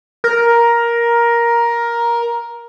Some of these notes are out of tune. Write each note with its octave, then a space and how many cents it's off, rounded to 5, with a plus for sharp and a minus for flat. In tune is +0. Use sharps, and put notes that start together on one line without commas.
A#4 +10